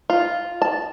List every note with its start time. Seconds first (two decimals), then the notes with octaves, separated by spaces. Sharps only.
0.10 F4
0.62 A5